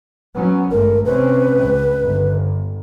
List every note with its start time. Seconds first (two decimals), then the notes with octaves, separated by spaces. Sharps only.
0.35 F#3 B3 C#4
0.71 G#1 G2 A3 A#4
1.05 C3 C4 C#4 B4
1.63 C#2
2.02 G1